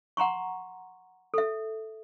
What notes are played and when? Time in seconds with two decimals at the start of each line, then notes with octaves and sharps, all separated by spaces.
0.17 F#5 A#5 C6 C#6
1.34 A4 E5